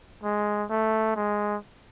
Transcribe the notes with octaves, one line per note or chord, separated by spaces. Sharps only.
G#3
A3
G#3